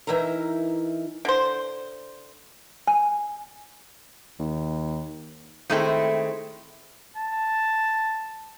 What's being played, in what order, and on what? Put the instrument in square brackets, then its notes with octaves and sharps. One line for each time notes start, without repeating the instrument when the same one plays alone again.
[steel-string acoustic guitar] E3 D#4 E4 A#4 A#5
[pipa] D3 C5
[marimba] G#5
[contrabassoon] D#2
[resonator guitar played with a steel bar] D#3 G#3 A3 C4 E4 A4
[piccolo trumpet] A5